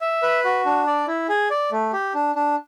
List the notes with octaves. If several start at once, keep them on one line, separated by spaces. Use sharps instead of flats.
E5
B4
F#4
D4
D5
E4
G#4
D5
A3
G4
D4
D4